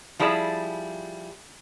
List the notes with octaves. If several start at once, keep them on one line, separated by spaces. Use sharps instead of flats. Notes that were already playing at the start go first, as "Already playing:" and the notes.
F3 G3 E4 G#4 C#5 A5